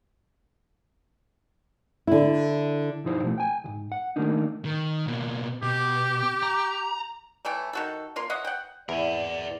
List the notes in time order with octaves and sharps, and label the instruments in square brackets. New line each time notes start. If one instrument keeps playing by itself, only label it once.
[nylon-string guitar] D3 E4
[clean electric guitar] B1 G2 F3 D#4 E4 C5
B2 F3 A3
G5 G#5
C2 G#2
F#5
D#3 A3 A#3 D4 D#4
[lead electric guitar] D#3
B2 A#3
[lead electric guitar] B2 [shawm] G4
[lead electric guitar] A#5
[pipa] E3 A3 C#5 G5
D#3 F#4 A4
A#3 F4 C6
C#5 D#5 E5 F#5
F#5 G5
[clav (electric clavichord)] E2 [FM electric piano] E4 [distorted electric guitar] A#4 G#5 [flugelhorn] D5